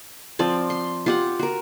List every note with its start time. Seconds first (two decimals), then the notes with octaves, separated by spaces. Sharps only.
0.39 F3 C4 D5
0.70 C6
1.06 F4 G4 F#5
1.39 F#4 A#4